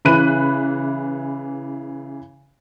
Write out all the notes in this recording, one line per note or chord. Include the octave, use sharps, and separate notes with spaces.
C#3 E3 B5 F#6 D#7